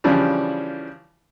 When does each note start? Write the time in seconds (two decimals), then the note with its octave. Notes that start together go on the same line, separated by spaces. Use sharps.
0.04 C#3 E3 F3 G3 D4